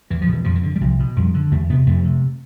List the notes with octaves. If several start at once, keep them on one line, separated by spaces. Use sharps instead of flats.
E2 E3
F3
B2
E3
F2 F3
E3
D3
G3
C2 F3
B2
F2 G3
D3
E2 A3
C3 B3
F2 A3
C3